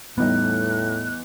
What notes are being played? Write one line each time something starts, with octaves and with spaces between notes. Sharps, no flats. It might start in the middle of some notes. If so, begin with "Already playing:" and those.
E2 A2 G3 G#3 B3 D#4 F#6